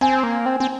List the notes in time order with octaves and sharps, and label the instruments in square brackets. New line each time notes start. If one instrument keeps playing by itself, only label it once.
[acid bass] C4 [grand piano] G#5
[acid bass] A#3
C4
C4